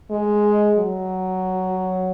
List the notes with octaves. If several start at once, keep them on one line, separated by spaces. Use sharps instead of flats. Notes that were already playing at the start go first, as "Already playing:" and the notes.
G#3
F#3